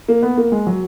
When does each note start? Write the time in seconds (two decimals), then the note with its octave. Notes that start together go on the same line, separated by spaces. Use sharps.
0.08 A#3
0.23 B3
0.37 A#3
0.52 G#3
0.67 F#3